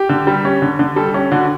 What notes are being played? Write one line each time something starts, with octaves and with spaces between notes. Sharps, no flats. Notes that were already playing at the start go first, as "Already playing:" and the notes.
Already playing: G4
D3
G3
C#4
D3
D3
G3 A4
C#4 G4
D3 F#4